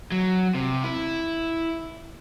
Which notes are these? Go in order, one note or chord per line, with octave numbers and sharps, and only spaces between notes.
F#3
C3
E4